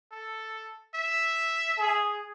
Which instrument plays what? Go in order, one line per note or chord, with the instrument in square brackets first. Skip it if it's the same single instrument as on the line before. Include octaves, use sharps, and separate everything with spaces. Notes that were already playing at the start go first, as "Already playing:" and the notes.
[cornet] A4
E5
[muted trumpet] G#4